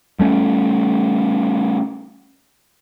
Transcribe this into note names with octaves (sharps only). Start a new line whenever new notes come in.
G3 A3 C#4